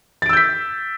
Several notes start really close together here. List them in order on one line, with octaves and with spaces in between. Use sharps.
A6 D7 E6 G6 B6